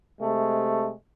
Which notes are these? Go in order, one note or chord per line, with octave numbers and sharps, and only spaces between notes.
C3 G#3 A3